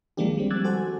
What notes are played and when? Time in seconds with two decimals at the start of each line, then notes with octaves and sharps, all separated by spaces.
0.17 D#3 F3 G#3 A#3 D4 G4
0.37 G3 C4
0.50 D6 E6 F#6 G#6 A6
0.64 F#4 A4 C5 G#5